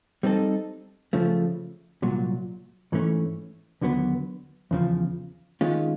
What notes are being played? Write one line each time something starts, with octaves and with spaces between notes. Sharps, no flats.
G3 C4 D#4 F#4 A4
C#3 F3 A3
C2 A#2 F#3
G#2 E3 A3 C#4
D#2 D3 F#3 B3
E2 C#3 F3
D#3 G#3 C#4 F4